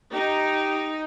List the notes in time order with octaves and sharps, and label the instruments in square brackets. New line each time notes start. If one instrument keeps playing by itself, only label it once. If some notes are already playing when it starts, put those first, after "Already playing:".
[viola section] D#4 [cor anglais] G4